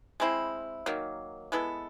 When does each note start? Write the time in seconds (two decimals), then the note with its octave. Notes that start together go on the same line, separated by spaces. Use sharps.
0.20 G#3 C4 E4
0.86 D#3 F#3 A#3
1.52 G#3 B3 E4 A4